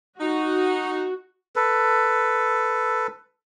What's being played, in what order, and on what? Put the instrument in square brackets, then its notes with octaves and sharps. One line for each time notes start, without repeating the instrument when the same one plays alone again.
[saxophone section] D#4 [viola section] F#4
[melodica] A4 B4